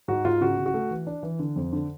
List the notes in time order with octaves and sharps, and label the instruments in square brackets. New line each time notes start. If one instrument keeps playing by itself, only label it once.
[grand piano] G#2 F#4
G#2 F4
C#3 F#4
C#3
F#4
A3
E3
D4
E3
D3
F2
D3